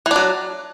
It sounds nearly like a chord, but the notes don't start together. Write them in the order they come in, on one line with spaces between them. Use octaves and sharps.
E3 D4 F#3